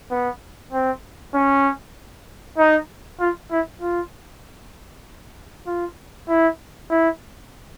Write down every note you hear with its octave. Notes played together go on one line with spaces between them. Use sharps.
B3
C4
C#4
D#4
F4
E4
F4
F4
E4
E4